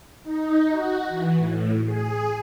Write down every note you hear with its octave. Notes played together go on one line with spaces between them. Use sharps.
D#4
F#4
E3
A2
G#4